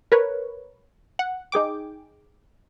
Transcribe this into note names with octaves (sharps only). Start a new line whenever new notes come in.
A#4 B4 C#5
F#5
D#4 G#4 G5 D6